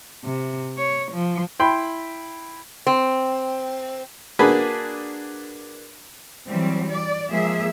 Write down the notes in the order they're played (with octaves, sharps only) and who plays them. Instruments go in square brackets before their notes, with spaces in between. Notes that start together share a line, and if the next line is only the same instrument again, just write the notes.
[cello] C3
C#5
F3
[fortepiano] E4 G5 B5 C6
[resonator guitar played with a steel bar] C4
[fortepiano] A#3 D4 F#4 G#4 B4
[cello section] E3 F#3 G3 C4
D5
F3 G#3 A#3 G#4 E5